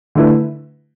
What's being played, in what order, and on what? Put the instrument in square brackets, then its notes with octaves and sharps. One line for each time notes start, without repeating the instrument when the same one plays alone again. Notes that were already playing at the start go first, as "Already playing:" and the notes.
[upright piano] D3 A3 E4 B4